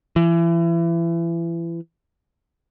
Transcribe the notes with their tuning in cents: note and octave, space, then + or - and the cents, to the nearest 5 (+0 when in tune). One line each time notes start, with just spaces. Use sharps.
E3 +30